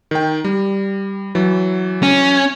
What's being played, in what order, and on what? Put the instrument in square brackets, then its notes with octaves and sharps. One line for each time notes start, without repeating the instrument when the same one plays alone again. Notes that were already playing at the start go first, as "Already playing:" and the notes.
[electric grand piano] D#3 G5
G3
E3 F#3
[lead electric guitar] C#4